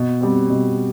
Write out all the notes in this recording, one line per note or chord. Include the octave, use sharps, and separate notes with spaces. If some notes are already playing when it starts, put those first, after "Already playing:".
Already playing: B2
G3 C4
B2